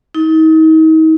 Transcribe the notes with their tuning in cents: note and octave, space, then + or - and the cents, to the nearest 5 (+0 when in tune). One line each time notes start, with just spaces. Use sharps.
D#4 +35